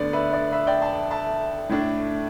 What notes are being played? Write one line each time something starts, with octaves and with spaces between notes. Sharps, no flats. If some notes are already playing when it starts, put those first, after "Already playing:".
Already playing: D2 D3 B3 D4 D5
B4 E5
D5
B4 E5
D5 G5
E5 A5
E5 A5
A2 A3 D4